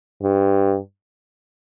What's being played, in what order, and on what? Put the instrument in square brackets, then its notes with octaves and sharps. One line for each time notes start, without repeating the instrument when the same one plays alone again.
[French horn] G2